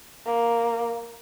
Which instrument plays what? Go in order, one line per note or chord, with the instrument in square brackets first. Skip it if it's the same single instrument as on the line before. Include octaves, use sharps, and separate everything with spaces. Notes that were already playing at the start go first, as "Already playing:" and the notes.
[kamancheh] A#3